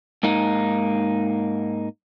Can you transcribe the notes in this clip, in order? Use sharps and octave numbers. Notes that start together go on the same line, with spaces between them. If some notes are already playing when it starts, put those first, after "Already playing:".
G#2 A#3 D#4